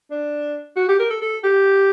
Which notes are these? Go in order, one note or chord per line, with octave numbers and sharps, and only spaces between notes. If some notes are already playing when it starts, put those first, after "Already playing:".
D4
F#4
G4
A#4
A4
A4
G4